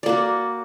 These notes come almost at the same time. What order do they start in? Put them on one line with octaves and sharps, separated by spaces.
D5 A#3 F#4